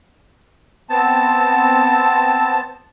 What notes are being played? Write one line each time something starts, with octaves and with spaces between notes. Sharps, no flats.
B3 C4 A5